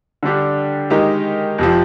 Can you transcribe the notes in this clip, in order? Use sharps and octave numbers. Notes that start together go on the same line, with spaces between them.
D3 G3 D4 G4
D#3 G#3 D#4 G4
F2 C3 F3